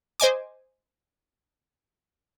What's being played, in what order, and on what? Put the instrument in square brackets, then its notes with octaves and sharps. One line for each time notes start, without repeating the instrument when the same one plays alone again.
[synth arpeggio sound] C5 D#5 G#5 D6